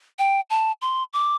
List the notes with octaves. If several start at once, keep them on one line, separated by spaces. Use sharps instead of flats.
G5
A5
C6
D6